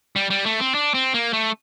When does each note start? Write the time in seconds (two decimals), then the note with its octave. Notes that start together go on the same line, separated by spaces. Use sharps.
0.16 G3
0.30 G3
0.46 A3
0.60 C4
0.75 D4
0.94 C4
1.14 A#3
1.33 A3